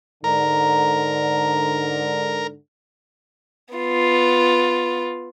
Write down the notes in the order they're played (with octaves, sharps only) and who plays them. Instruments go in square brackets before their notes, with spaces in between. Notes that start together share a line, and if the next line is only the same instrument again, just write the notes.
[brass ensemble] G#2 D3 [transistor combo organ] A#4 [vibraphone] A#5
[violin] B3 F4